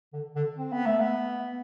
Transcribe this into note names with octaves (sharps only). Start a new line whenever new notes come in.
D3
D3
C4
B3
A3
B3